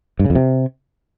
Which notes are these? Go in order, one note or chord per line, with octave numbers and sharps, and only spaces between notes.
G2
C#3
F2
C3